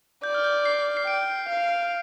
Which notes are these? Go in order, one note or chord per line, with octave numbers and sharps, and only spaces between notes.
D5 G6
F6
G6
C7
C7
G5 D7
F5